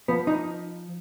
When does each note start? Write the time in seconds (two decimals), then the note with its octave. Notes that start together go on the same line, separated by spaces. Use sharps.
0.08 F3 B3
0.27 D#4